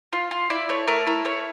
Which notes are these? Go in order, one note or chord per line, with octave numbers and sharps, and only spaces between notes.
F4
F4
E4 D5
A3 C#5
A3 A#4
E4 A#4
A3 C#5